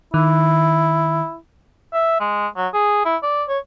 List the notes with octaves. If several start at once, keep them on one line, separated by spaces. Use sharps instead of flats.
D#3 E4
E5
G#3
F#3
G#4
E4
D5
C#5